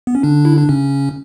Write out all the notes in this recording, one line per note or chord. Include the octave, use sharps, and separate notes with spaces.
B3
C#4
D3 D4
E4
D4
C#3 C#4